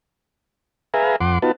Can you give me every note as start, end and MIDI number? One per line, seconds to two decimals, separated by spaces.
0.94 1.16 68
0.94 1.16 71
0.94 1.16 76
0.94 1.16 77
0.94 1.16 80
0.94 1.16 82
1.21 1.39 41
1.21 1.39 78
1.21 1.39 84
1.21 1.39 86
1.42 1.52 59
1.42 1.52 63
1.42 1.52 65
1.42 1.52 66
1.42 1.52 71
1.42 1.52 81